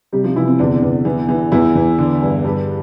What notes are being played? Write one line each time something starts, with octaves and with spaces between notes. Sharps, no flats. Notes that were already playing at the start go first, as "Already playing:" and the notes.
C3 G3 G4
F3 F4
C3 E3 E4
C4
E2 D3 D4
E2
E3
E3
E2 E3 E4
E2
D3
G2
G2 G3 G4